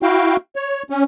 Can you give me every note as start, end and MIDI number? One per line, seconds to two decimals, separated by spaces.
0.02 0.36 64
0.02 0.36 66
0.02 0.36 77
0.02 0.36 79
0.56 0.83 73
0.90 1.03 61